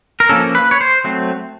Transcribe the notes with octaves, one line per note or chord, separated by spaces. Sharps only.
A#4
F3 A#3 C#4 A4
B4
C#5
C5
F#3 A3 C4